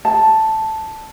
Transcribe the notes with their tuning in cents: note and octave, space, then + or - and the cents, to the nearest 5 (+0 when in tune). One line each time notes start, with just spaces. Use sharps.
A5 +0